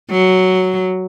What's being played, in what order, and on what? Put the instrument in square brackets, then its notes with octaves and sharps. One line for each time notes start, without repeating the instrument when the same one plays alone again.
[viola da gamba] F#3